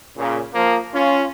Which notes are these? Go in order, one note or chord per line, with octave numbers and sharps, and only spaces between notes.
A#2 C#3
F3 A#3
C#4 F4